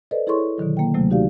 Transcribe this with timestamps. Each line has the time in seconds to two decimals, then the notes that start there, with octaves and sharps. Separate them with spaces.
0.11 A4 B4 C5 D5 D#5
0.27 E4 G#4 A4 C#5 C6 C#6
0.58 B2 D3 D#3 F#3
0.77 A#3 G5
0.94 D2 C3 F#3 A3
1.10 D#4 F#4 G4 D5 F5